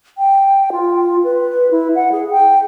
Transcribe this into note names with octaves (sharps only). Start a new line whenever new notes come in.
G5
F4
B4
E4
F#5
G#4
G5